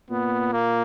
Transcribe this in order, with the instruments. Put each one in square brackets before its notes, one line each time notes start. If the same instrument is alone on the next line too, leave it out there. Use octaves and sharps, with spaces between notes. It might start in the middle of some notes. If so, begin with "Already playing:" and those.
[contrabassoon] A#2 [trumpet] B3
[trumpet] A#3